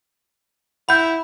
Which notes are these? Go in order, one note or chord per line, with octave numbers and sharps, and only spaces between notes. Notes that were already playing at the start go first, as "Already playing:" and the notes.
E4 F#5 B5 G6